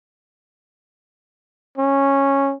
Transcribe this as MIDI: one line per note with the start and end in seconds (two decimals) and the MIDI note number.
1.78 2.53 61